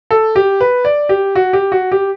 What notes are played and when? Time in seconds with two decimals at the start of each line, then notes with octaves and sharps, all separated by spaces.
0.11 A4
0.36 G4
0.61 B4
0.85 D5
1.09 G4
1.35 F#4
1.53 G4
1.72 F#4
1.92 G4